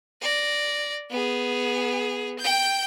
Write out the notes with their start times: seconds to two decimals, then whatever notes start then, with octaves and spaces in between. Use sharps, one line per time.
0.21 D5 A#6
1.10 B3 G#4
2.39 G5 G6